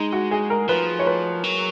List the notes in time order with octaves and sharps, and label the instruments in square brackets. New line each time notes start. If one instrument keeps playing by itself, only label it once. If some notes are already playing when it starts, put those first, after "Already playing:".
Already playing: [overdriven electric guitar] G#3 [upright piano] D#4
[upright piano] F#4
G#4
A#4
[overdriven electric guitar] F3 [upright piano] B4
[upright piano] C#5
B4
[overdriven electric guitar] F#3